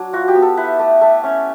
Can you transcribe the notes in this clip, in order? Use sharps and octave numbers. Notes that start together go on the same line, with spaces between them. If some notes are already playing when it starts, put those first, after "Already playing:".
Already playing: F#3 D4
F4 F#4
G4
B3
A4
E4 B4
A3
A3
C#4